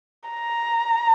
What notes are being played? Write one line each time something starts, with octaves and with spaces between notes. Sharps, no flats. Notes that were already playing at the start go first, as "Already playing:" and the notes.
A#5